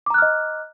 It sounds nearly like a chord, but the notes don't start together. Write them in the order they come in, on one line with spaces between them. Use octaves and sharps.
D6 A#5 F#6 F6 D#5